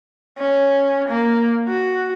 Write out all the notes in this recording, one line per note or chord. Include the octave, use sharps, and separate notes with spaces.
C#4
A#3
F#4